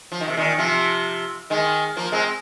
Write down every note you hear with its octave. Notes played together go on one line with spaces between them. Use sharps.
F3
D#3
C3
A#2 D#3
C3 F3
D#3 G#3
F3 A#3
G#3 C4